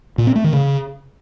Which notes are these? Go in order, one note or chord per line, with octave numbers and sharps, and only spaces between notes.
A#2
C4
A3
D#3
C#3